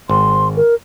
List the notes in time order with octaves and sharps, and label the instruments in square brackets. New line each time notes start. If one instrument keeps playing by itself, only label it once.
[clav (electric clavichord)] G#1 [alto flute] C6
[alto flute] A#4